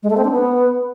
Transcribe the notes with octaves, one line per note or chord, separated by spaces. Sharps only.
G#3
A3
C4
D4
B3